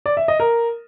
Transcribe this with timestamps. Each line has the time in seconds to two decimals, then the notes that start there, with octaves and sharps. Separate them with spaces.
0.06 D5
0.17 E5
0.28 D#5
0.40 A#4